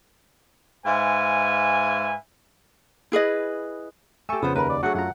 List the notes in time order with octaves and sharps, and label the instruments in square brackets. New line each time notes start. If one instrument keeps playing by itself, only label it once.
[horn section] G#2 B4 E5 F5 G#5
[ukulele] E4 G#4 B4 D#5
[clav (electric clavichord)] A3 A4 [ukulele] G4 G#5 [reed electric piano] C#6 E6
[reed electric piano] F2 C#3 [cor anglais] B3 [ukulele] F4 B4 C5
[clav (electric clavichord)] D#2 [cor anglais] A#4 [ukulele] B4 B5
[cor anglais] D5
[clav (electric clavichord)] F#3 A3 [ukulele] D4 G#4 [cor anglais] F#4
[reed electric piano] F#2 F4 A#5 [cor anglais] F#5